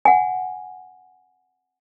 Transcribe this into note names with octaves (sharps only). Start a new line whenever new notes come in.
F#5 G#5